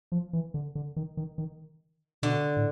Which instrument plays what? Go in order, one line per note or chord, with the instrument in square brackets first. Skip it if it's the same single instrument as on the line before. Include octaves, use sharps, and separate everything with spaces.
[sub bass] F3
E3
D3
D3
D#3
D#3
D#3
[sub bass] B2 [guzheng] D3
[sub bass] A2